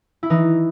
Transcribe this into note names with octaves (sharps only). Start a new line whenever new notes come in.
E4
E3 D#4